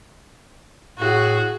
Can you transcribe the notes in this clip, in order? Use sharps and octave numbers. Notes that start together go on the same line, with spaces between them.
A2 F#4 G#4